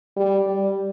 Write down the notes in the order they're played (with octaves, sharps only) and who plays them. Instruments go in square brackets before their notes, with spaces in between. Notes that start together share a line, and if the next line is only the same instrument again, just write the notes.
[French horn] G3
G3